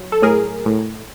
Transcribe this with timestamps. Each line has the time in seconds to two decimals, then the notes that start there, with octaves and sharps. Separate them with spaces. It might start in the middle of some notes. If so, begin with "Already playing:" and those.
Already playing: F#3
0.12 A4
0.22 A2 G#4 A#4
0.66 A2